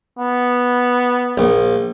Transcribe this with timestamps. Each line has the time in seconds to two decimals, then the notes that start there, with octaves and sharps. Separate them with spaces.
0.19 B3
1.38 A#1